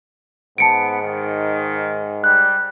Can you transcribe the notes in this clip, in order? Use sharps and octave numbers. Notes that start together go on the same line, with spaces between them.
G#2 B3 A5 C#7 D7
D#3
G3 F#6